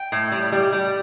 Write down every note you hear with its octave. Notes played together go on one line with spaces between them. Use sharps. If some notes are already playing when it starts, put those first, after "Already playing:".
Already playing: G5
A2
G3
G3
G3